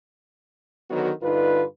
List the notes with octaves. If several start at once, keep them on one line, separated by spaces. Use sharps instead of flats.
D3 D#3 F#3 B3 F#4
G2 D3 D#4 F4 B4